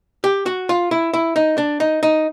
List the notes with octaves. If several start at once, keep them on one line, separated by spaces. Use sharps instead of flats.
G4
F#4
F4
E4
E4
D#4
D4
D#4
D#4